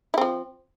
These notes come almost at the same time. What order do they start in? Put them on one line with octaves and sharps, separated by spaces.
E4 C4 F3